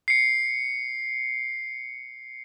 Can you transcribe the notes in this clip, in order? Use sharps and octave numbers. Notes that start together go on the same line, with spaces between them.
C7 C#7